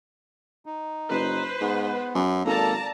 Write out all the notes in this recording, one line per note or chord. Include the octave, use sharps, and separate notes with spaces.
D#4
F#1 B4 C5
G#2 B3
F#2
G#1 A#3 A4 D5 A5 A#5